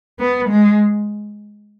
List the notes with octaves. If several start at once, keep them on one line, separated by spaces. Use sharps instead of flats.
B3
G#3